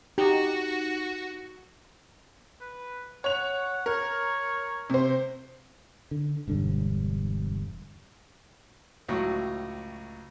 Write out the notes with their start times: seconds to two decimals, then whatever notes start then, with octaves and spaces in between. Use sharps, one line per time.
0.18 D#4 F#4 G4
2.61 B4
3.24 C#5 F#5 F7
3.86 A#4 C#5
4.90 C3 C5
6.11 D3
6.48 E1 G2 D3
9.08 C#2 A2 F#3